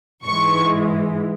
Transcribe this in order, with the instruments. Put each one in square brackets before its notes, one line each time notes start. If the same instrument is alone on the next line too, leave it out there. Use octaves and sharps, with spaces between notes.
[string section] G#2 E3 G#3 C#6